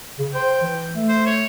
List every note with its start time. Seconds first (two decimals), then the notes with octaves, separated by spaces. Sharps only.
0.19 C#3
0.34 C5 G5
0.62 E3
0.95 A3
1.08 C5
1.26 C#5